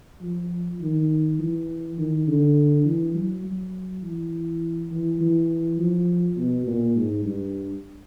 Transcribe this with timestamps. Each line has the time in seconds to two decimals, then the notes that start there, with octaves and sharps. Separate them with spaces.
0.22 F3
0.81 D#3
1.39 E3
1.98 D#3
2.28 D3
2.85 E3
3.14 F#3
3.45 F#3
4.03 E3
4.91 E3
5.21 E3
5.78 F3
6.38 B2
6.67 A#2
6.96 G#2
7.25 G2